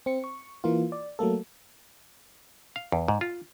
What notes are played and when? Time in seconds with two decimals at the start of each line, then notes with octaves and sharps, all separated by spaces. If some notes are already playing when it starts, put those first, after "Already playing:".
0.06 C4 C#7
0.24 C#6
0.64 E3 A#3 F4
0.92 D5
1.19 F#3 A3 A#3 A4
2.76 F5
2.92 E2
3.08 G#2
3.21 F4